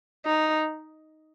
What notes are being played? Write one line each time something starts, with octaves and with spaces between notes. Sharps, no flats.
D#4